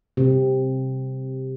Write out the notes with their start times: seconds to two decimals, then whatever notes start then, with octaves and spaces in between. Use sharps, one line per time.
0.17 C3